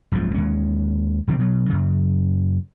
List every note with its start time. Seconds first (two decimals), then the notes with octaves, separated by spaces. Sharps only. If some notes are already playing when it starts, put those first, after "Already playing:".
0.12 F#1 C#2 G#2 F3
0.34 D#2 G#3 C#4
1.27 E1 D3 F3 C4
1.39 B2 F#3
1.69 F#2 C#3